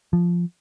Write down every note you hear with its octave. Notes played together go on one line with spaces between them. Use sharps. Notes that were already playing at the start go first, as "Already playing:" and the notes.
F3